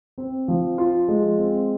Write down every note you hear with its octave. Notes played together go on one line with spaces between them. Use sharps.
C4
F3
F4
G#3
C4